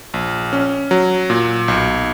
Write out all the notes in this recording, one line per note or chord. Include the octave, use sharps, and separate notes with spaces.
A#1
C#4
F#3
A#2
B1